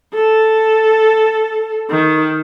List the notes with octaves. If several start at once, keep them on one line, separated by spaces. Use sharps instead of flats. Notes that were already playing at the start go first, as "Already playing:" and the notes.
A4
D#3